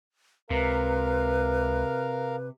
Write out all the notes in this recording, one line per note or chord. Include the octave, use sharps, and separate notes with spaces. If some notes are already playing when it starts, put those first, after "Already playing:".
C#2 C3 A#4 B4 F5